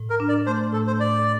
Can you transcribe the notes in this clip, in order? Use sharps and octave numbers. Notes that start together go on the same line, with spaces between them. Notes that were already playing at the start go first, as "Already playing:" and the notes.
Already playing: A2
A#4
D4
D5
A3 C5
A2 A4
C5
A2 D5